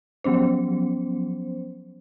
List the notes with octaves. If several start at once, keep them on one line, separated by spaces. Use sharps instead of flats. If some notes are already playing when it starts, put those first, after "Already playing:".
F3 F#3 B3 C#4 C5